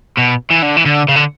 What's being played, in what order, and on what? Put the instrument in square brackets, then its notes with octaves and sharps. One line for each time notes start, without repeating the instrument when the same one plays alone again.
[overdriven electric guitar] B2
E3
D3
E3
D3
C#3
D3